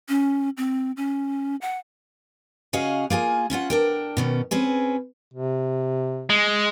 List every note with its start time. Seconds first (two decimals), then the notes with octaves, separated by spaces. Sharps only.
0.09 C#4
0.57 C4
0.97 C#4
1.62 F#5
2.73 C#3 C#4 F#4 G#4 D#5 F5
3.10 A#3 F4 G#4 G#5
3.50 C#4 E4 F4 F#5
3.70 D4 A#4 G5
4.17 B2 D#3 C#4
4.51 C4 C#4 G#4 B4
5.33 C3
6.30 G#3